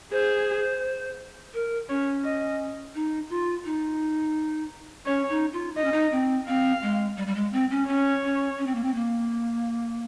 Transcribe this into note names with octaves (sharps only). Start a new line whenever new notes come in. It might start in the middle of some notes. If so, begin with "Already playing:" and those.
G#4 C5
A#4
C#4 C#5
D#5
D#4
F4
D#4
C#4 C#5
D#4
F4
D#4 D#5
C#4
D#4
C4
C4 F5
G#3
G3
G3
G#3
C4
C#4
C#4 C#5
C#4
C#4
C4
A#3
C4
A#3